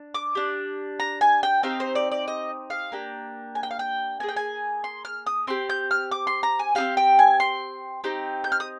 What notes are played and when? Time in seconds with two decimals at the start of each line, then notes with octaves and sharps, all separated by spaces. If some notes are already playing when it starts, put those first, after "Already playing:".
Already playing: D4
0.14 D6
0.35 D4 G4
1.00 A#5
1.21 G#5
1.43 G5
1.63 C4 D#4 G4 F5
1.80 C5
1.95 D5
2.12 D5
2.28 D#5
2.70 F5
2.92 A#3 D4 G4
3.55 G#5
3.63 G5
3.71 F5
3.79 G5
4.20 A#3 D#4 G#4 G#5
4.29 G5
4.37 G#5
4.84 C6
5.05 F6
5.26 D#6
5.47 C4 G4 C6
5.70 G6
5.91 F6
6.12 D6
6.27 C6
6.43 A#5
6.59 G#5
6.75 C4 D#4 G4 F5
6.97 G5
7.19 G#5
7.40 C6
8.04 C4 D#4 G4
8.44 G6
8.52 F6
8.60 D#6